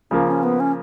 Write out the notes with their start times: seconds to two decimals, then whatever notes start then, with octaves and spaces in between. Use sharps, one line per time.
0.11 C#3 F3 A#3 C#4
0.27 C#4
0.43 B3
0.60 C#4